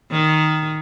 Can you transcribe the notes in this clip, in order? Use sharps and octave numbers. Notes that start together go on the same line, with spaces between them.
D#3